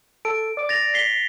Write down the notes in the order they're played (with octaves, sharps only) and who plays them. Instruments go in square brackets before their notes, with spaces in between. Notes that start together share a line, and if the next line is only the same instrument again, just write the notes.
[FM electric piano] A4 [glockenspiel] D7
[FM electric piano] D5 D6
[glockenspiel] A6 A#6 F7
B6 C7 G7